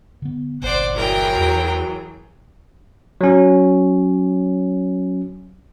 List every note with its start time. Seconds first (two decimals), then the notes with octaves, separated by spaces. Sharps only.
0.22 D3 B3
0.62 G1 C2 A#2 C5 D5 F#5
0.95 E3 F#3 G#4 A#4 G5
1.37 E2
3.21 F#3 C#4